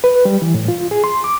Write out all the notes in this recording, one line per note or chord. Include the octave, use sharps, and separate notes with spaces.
B4
G3
E3
A2
F4
G#4
C6
D6